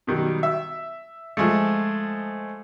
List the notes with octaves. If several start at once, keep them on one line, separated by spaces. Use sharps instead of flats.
B2 D#3 F#3 G3
E5
F3 G#3 A3